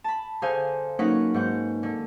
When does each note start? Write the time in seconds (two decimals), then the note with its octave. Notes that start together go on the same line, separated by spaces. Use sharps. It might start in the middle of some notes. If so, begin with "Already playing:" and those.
0.04 A5 B5
0.42 D3 G#4 C5 F5 G#5
0.99 F#3 A#3 C#4 D#4 B4 F#5
1.34 G#2 F#5 G6
1.83 D3